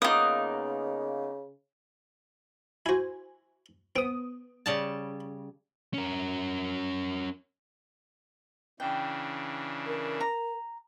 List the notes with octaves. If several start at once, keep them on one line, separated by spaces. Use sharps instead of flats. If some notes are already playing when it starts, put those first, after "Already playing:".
C#3 A#3 B3 D#4 F4 D#6
E4 F#4 C5 G#5
B3 C4 G5 D#6
C#3 G3 A5
C#4 A#4
C#3 E3 D4 G5
A#4
A#5